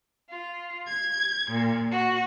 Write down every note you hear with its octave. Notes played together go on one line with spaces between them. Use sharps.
F4
G#6
A#2
F#4